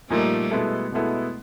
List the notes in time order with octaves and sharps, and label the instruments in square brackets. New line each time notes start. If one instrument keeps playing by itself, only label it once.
[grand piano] A#2 F3 A#3 D#4 [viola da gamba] G3 A3
[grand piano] B2 G#3 B3 E4 A4
B2 G#3 B3 E4 A4